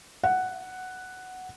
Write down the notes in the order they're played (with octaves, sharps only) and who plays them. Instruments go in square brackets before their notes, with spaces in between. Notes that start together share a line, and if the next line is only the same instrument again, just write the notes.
[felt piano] F#5